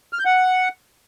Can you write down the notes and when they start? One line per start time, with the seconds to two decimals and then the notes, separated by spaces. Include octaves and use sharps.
0.13 F6
0.19 G6
0.25 F#5